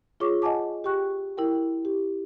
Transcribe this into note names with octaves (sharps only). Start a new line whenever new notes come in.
F4 G#4 C#5 C#6 D6
D#5 F#5 G#5 A5 D6
G4 G5 C#6 F#6
E4 A#4 G5
G4